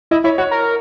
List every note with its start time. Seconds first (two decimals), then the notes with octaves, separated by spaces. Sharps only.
0.11 E4 D#5
0.24 E4 C#5
0.38 F#4 C#5
0.51 A#4